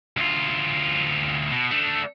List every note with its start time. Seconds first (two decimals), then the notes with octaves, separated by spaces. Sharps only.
0.17 D2 F4
1.51 B2
1.71 A3 D4